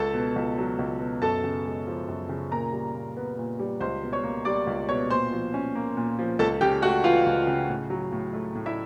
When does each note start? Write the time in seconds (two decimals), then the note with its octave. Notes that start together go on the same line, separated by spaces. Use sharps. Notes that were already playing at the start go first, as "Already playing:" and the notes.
Already playing: C#2 A4 A5
0.14 B2
0.36 C#2
0.58 F#3
0.79 C#2
1.00 B2
1.22 F#2 A4 A5
1.44 C#3
1.65 G#3
1.87 F3
2.08 F#2
2.29 C#3
2.51 A#2 A#4 A#5
2.72 G3
2.94 A#2
3.17 B3
3.38 A#2
3.59 G3
3.80 C#2 C5 C6
4.03 B2
4.13 C#5 C#6
4.23 A#3
4.45 G3 D5 D6
4.67 C#2
4.89 B2 C#5 C#6
5.10 A#2 C5 C6
5.32 F3
5.54 C#4
5.75 A#3
5.97 A#2
6.19 F3
6.39 C#2 A4 A5
6.61 C#3 G4 G5
6.82 A3 F#4 F#5
7.04 E3 F4 F5
7.26 C#2
7.47 C#3
7.69 A2
7.90 F#3
8.12 A2
8.33 A3
8.55 A2
8.66 E4 E5